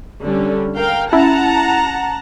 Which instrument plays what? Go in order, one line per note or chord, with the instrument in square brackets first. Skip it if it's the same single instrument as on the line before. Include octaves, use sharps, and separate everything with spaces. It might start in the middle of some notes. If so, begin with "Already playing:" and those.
[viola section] D3 G3 C#4
A#4 F5 G5
[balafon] C#4 [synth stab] E4 [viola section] F#5 A5 A#5